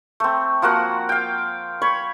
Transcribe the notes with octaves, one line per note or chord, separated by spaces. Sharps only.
A3 C4
F3 A#3 F#4 F#5
F5 G5
C#5 B5 C#6